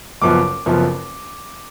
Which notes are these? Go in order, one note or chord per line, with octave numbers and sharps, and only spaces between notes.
F#1 F#2 F3 B3 D6
F#1 F#2 F3 B3